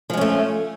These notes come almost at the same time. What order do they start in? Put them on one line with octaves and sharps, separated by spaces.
F3 G#3 C#4 A3